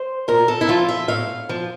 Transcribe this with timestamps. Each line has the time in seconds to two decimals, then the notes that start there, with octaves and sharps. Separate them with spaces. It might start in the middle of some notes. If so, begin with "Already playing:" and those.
Already playing: C5
0.28 A#2 A#4
0.48 A4
0.61 E4
0.68 F3 F4
0.89 E5
1.08 A2 F5
1.49 F3